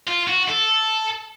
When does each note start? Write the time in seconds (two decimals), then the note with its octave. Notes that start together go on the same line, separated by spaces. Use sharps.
0.07 F4
0.27 F#4
0.48 A4